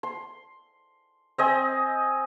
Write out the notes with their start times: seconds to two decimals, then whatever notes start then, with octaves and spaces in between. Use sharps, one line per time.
0.03 C6
1.38 C4 D#5 G#5